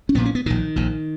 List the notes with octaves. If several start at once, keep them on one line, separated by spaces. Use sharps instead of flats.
C#4
A#1 A#2 B3
C#4
B3
A#1 A#2 D#3
A#1 A#2